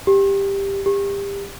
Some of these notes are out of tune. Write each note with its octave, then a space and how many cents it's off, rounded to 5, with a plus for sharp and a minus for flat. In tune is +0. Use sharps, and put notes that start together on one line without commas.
G4 +10
G4 +30